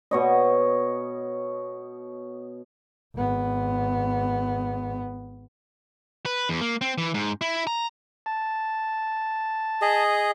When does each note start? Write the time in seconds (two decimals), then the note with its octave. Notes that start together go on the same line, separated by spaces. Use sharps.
0.11 B2 C#5 D#5
3.15 G#1 B3
6.26 B4
6.49 E2
6.61 A#3
6.81 C4
6.98 E3
7.14 G#2
7.41 E4
7.67 A#5
8.26 A5
9.82 G#4 D#5